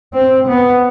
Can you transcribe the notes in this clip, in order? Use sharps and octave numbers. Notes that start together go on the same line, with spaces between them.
C4
B3